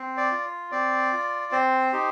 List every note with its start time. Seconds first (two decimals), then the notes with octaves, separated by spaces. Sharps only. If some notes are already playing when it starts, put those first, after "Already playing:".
Already playing: C4
0.17 D5
0.31 F4
0.72 C4 D5
1.12 F4
1.52 C4 C5
1.93 D#4 G4